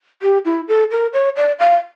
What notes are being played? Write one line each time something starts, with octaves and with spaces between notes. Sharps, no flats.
G4
E4
A4
A#4
C#5
D5
F5